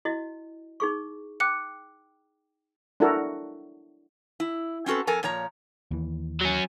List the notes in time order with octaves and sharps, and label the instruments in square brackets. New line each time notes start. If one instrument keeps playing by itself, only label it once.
[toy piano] E4 F#4 D#5
D#4 G#4 C#6
[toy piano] G5 [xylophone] D6 F#6 C#7
[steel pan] D4 E4 F#4 A4 A#4
[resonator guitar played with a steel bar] E4
C4 C#4 F#4 A4 B4
F2 A4 A#4 G#5
A#2 F3 C#5 A#5
[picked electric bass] D#2 E3
[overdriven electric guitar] F#3 C#4